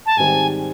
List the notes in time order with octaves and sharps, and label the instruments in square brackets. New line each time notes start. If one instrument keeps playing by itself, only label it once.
[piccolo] A5
[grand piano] G#2 D#3 G3 C4 [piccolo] G#5